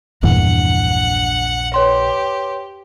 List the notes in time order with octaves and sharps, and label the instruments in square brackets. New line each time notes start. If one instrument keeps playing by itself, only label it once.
[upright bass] A#1 D4 [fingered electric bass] E2 G2 E3 [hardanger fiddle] F#5
[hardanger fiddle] G4 [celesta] B4 C#5 C6